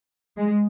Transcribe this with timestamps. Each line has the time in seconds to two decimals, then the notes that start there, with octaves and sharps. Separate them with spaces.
0.37 G#3